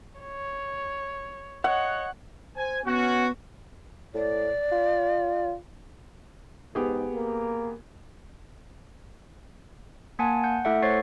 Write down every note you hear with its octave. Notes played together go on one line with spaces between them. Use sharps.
C#5
C#5 D#5 F#5
C5 G#5
B3 C#4 F#4
A2 D5
F4
G#2 B3 G4 G#4
A#3
A#3 F#5 G#5 A5
F#5 G6
A3 E4 A4 E5 F#5
A3 C5 C#5 C#6 A6 C7